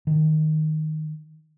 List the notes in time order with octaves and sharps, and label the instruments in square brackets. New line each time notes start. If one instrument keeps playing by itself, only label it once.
[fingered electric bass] D#3